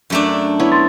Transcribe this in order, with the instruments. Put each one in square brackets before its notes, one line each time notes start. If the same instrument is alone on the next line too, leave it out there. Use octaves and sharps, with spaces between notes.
[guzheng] F#2 A3 D4
[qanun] B3 E4 C#5
[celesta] C6 A6